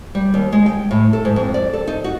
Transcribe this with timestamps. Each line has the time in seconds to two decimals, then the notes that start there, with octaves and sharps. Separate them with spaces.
0.15 G3
0.34 D#2
0.52 G#3
0.66 G5
0.91 A2
1.13 A4
1.25 G#2
1.36 F2
1.54 D5
1.73 A4
1.87 D#4
2.04 F#4